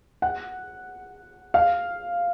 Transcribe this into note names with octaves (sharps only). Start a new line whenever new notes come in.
F#5
F5